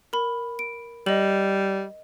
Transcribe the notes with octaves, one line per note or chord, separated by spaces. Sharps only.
A#4 B5
D7
G3 D#5 F#7